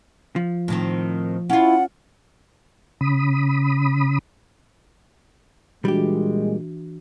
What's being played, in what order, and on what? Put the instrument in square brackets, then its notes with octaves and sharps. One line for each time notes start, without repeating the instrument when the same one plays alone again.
[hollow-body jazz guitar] F3
[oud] A2 D#3 C4
[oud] C#4 F4 [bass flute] E4 [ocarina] F#5
[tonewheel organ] C#3 B5 D#6
[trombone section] A#2 G#3 [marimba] E3 D4 F#4 [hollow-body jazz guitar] G3 G4